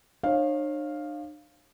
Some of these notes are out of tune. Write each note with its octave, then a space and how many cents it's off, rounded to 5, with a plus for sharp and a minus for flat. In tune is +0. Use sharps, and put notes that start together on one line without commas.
D4 +45 C#5 -35 F5 +0